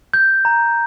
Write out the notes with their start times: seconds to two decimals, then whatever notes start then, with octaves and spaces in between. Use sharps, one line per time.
0.14 G6
0.45 A#5